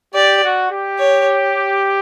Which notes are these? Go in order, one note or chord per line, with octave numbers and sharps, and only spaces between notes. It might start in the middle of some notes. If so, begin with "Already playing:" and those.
G4 D5
F#4
G4
C#5